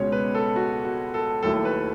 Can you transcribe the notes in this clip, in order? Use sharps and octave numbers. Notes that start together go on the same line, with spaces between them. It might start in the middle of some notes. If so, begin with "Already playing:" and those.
Already playing: C#2 B2 G#3 C#4 C#5
B4
A4
F#4
F#4
A4
D#2 D#3 F#3 A3 E4 A4
B4